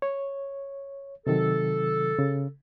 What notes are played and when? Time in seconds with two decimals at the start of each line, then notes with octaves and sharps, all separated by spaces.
0.02 C#5
1.27 C3 D#3 F#3 A4
2.19 C#3